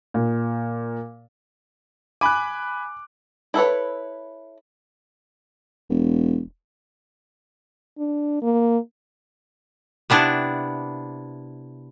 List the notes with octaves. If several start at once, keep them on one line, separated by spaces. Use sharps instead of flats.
A#2
G#5 B5 D6 F#6
E4 A4 B4 C#5
E1
D4
A#3
C3 B3 D4 E4